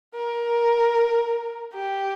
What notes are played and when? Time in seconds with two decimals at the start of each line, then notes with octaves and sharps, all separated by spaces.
0.15 A#4
1.73 G4